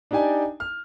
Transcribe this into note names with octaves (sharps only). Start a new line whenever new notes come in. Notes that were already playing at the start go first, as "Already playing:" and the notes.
D4 D#4 G4 D5 G#5
F6